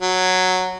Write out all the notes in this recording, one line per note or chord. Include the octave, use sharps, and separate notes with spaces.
F#3